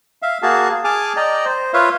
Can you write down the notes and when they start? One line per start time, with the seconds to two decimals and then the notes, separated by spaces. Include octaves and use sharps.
0.22 E5 F5
0.43 A#3 F#4 G#4 F5 A5
0.84 G#4 G#5 A5 D6 F6
1.17 D5 D#5 G5 A#5
1.45 C5
1.74 F4 B4 C#5 E5 F5